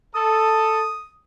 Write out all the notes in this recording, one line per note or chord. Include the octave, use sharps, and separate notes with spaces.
A4 D#6